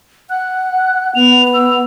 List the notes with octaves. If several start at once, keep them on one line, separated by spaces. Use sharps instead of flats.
F#5 F#6
B3 F7
E6